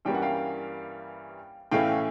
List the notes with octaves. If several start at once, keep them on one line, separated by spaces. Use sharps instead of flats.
G2 E3 G3 A#3 C#4 G5
F#5
F5 G5
A2 E3 A3 C#4 E4 F5 G5